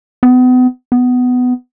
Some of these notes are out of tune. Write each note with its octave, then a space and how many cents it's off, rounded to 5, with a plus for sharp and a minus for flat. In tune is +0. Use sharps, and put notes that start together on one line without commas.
B3 +35
B3 +15